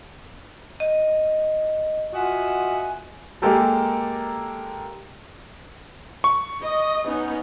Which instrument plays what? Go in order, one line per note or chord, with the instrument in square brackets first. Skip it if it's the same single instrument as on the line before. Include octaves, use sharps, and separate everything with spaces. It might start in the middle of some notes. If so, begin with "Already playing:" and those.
[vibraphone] D#5
[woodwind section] F4 F#4 D#5 E5 F#5 G#5
[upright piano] G#3 A#3 G4 A4 A#4
[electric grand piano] C#6
[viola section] D#5
B3 C#4 D#4